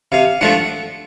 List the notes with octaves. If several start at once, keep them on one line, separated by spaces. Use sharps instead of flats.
C3 F5
F3 A3 D4 F4 F#5